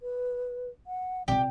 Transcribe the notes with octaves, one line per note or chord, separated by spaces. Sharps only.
B4
F#5
C3 F4 G4 D5